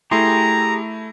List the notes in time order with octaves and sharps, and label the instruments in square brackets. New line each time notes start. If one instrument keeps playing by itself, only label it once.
[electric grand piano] A3 E4 [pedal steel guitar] G4 G#4 C6 [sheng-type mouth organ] A#5